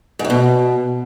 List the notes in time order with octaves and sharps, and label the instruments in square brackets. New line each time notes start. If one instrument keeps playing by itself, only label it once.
[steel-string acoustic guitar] G#2
F#2
B2